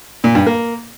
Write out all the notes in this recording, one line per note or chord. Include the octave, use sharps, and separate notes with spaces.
A#2
G2
A#3